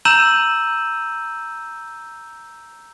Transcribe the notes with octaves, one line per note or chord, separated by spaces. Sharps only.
A#5 E6 G6 D#7 E7 F#7